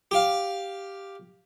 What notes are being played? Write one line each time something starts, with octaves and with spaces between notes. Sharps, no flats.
G4 F5